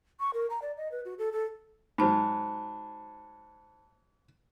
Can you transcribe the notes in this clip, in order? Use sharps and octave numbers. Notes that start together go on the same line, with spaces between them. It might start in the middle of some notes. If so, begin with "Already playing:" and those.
C#6
A#4
A#5
D5
D#5
B4
F#4
A4
A4
G#2 F#3 C5 A5 B5